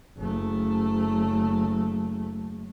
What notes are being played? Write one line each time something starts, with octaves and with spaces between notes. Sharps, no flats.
F#1 A3